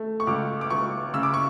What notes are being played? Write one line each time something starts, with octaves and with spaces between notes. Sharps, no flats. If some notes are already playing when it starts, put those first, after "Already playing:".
Already playing: A3
C#6
C#2 D6
D6
C#2 C#6
C#3 E6
D6
C#6